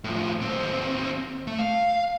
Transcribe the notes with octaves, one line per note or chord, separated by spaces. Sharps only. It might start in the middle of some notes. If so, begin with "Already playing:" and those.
A2 F3
D#2 C4
A3
F5